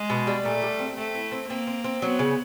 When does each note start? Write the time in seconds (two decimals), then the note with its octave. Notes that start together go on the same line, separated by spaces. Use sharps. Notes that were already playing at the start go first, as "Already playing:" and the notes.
Already playing: G#3
0.10 B2
0.27 G3
0.45 A#2 A3
0.62 G3
0.79 C4
0.97 A3 C4
1.15 E4
1.32 C4
1.49 A#3 C4
1.67 C4
1.84 C4
2.02 F#3 B3
2.19 C#3